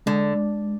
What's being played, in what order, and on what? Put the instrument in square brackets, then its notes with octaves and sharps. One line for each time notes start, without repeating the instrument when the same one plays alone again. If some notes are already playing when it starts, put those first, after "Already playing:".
[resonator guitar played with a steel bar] D3 [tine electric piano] G#3
[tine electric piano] G#3